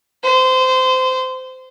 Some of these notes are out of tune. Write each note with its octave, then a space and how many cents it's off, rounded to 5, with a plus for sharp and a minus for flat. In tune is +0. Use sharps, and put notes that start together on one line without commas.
C5 -20